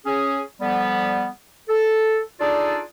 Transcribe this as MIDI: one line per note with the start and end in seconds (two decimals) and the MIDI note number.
0.06 0.40 61
0.06 0.40 68
0.61 1.27 50
0.61 1.27 53
0.61 1.27 55
0.61 1.27 59
1.69 2.20 69
2.40 2.80 62
2.40 2.80 63
2.40 2.80 65
2.40 2.80 68
2.40 2.80 69
2.40 2.80 74